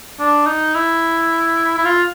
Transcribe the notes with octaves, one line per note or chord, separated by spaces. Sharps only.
D4
D#4
E4
E4
F4